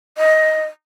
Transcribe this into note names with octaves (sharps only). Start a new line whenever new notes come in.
D#5